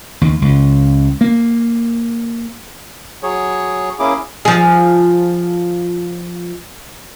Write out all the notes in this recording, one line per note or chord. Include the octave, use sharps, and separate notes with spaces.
D#2
C#2
A#3
F#3 G#4 C#5
A#3 C#4 E4 G#4 D6
F3 G#4